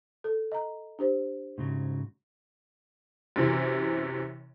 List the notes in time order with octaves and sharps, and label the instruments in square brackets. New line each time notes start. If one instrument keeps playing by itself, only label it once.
[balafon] A4
D#5 A#5
D4 G4 C5
[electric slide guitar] G#2 C#3 F#3
[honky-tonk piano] F#2 C3 E3